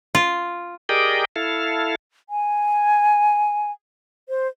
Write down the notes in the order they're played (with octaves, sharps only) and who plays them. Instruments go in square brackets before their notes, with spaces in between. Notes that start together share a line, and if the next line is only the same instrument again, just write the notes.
[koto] F4
[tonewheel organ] G4 G#4 A#4 D5 D#5 G5
E4 A4 F5
[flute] G#5
C5